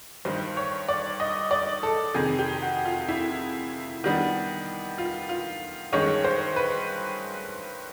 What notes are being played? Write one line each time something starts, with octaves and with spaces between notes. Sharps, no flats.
G2 D#3 G3 C5
C#5
D5
D#5
D5
A4
F2 C3 D#3 G#4
G4
F#4
F4
E4
D#3 G3 B3 D4
F4
F4
G2 D#3 G#3 C#4 C#5
C5
B4